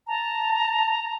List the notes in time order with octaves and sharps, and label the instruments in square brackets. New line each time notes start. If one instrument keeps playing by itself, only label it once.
[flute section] A5 [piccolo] A#5